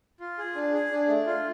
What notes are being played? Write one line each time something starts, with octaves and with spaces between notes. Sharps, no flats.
F4
G#4
D4
G#4
D4
A3
F4